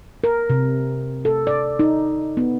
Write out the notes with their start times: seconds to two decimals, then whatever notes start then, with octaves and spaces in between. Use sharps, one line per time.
0.24 A#4
0.50 C3
1.25 A4
1.47 D5
1.79 D#4
2.37 B3